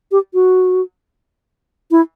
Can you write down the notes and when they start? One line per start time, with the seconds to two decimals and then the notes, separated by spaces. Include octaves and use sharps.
0.12 G4
0.34 F#4
1.91 E4